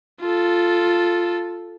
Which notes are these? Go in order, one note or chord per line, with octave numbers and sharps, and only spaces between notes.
F4 A4